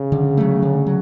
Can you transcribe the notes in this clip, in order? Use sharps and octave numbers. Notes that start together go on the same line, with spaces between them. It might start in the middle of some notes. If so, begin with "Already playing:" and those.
Already playing: C#3
D3
F#3 A3
D3
F#3